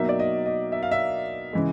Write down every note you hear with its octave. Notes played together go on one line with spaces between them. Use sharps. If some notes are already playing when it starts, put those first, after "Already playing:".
Already playing: B2 F#3 A#3 D#4 E5
D5
D#5
D#5
E5
F5
E5
C#3 E3 G#3